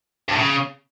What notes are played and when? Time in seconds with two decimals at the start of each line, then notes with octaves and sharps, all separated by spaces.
0.28 G2
0.33 A2
0.38 C#3